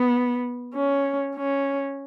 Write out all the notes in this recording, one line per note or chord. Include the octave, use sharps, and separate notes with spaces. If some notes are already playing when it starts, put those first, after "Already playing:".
Already playing: B3
C#4
C#4